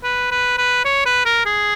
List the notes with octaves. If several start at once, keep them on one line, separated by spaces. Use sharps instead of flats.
B4
B4
B4
C#5
B4
A#4
G#4